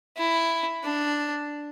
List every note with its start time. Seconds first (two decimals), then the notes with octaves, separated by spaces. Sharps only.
0.17 E4
0.84 D4